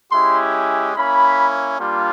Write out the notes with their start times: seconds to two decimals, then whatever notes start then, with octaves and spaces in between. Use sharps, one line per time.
0.11 G#3 C#4 E4 G4 C6
0.95 A#3 C#4 E4 B5
1.79 G3 A#3 D4 F4